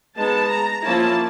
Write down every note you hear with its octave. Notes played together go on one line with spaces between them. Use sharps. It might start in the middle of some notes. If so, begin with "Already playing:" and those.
G#3 B3 D#4 A5
A#5
F3 A#3 C#4 E4 A5